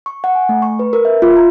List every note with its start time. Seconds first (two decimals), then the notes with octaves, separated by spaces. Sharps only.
0.06 C#6
0.24 F#5
0.35 G#5
0.49 A3
0.62 C#6
0.79 B4
0.93 A#4
1.05 E5
1.22 F4
1.37 A#5